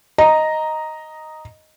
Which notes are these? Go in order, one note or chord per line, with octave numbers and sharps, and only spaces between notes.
D#5 A#5